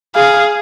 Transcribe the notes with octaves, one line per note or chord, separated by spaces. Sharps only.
G#4 F5